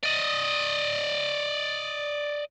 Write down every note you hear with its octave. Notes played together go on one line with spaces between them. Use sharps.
D5 D#5